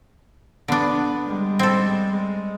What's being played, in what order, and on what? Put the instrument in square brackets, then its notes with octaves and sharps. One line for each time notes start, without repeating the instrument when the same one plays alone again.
[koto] D3 D4 [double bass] B3
[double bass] G3 G#3
[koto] C4 A4
[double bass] G#3